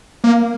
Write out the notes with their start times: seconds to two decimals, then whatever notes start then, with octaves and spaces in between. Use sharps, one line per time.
0.24 A#3